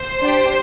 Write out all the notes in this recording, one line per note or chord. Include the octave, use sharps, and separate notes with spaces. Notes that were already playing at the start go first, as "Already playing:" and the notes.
Already playing: C5
D4 G4